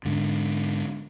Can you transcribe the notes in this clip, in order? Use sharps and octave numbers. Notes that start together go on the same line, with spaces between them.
G#2 D3